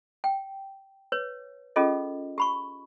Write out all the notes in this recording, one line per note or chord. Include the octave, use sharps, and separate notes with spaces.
G5
B4 C#5
C#4 F4 G#4 A4 D#5
G4 B5 C#6